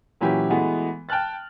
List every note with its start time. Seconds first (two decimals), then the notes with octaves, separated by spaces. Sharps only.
0.21 A#2 E3 F#3 C#4 E4 G4
0.50 E3 G#3 A3 B3 F#4
1.09 G5 A5 F6 F#6 A6